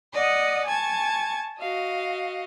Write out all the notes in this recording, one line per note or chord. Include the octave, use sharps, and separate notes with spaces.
D5 D#5 F#5 D#6
G#5 A5 C#6 G#6
F#4 D#5 F5